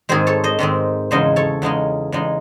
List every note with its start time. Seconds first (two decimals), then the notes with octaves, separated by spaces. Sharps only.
0.09 G#2 D#3 G#3 C4 G#4 C5
0.27 A4 C#5
0.44 C5 D#5
0.59 G#2 D#3 G#3 C4
1.11 E2 C#3 G#3 D#4 C5 D#5
1.36 A4 C#5
1.62 E2 C#3 G#3 D#4
2.12 E2 C#3 G#3 D#4